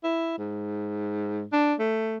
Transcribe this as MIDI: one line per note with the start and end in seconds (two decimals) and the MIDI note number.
0.04 0.35 64
0.39 1.47 44
1.52 1.74 62
1.79 2.18 57